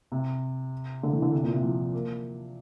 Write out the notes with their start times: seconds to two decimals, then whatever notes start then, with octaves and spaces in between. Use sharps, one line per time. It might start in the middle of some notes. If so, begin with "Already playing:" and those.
0.12 C3
1.03 D3
1.13 E3
1.22 D3
1.33 C3
1.43 A#2
1.54 C3
1.63 F3
1.93 A#3